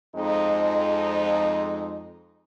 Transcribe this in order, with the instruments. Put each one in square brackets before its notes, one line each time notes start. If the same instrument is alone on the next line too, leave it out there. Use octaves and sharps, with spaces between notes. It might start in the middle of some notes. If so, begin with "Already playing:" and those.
[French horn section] F2 G#3 D#4